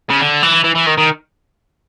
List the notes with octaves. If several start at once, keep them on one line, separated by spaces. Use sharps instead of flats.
C#3
D3
E3
E3
E3
D#3
D#3